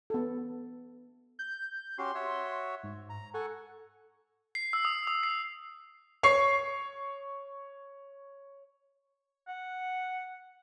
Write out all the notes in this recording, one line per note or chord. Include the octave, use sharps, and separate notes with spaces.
B3 A4
G6
C#4 F#4 G4 C6
F#4 C#5 E5
G#2
A#5
A4 F#5 G#5 C#6
C7
E6
D#6
D#6
C7
C#5 C#6 C7
F#5